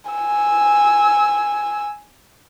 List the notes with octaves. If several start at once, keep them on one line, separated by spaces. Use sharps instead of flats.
G#5 E6